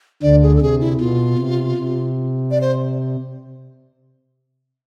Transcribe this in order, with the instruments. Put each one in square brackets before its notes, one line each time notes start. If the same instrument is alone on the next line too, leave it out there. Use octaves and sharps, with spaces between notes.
[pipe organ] D2 D3 [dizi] D5
[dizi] G#4
A4
[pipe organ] C3 [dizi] G#4
[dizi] E4
[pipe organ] B2 [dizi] F4
[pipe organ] C3
C3
[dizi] D5
C5